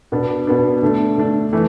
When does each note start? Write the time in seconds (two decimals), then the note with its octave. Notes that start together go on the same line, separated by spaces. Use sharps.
0.12 B2 B3 D4
0.47 B2 B3 D4
0.82 D3 A3 D4
1.17 D3 A3 D4
1.53 E3 A3